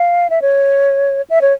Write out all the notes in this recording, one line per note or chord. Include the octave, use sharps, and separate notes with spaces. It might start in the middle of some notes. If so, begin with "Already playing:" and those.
Already playing: F5
E5
C#5
E5
C#5